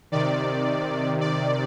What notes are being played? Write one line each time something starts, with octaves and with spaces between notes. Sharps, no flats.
C3 D#3 D5
D5